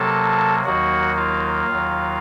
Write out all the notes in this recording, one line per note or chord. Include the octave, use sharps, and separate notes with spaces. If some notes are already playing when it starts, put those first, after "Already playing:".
Already playing: C3 F#3 A#3 A4 A5
D#2 D#3 F#3 A#3 F#4 F#5
F4 F5
D#2 D#3 F#3